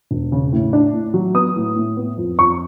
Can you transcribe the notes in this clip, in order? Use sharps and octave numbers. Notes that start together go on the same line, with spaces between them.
E1
C#3
A2
D4
A2
F#3
B3 D#6
A2
A2
B3
F2
F2 C#6